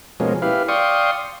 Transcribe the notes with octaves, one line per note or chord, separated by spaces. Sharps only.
B2 F3 G#3 A#3 C#4
E4 G4 B4 F5
D5 F5 G5 C6 C#6 D#6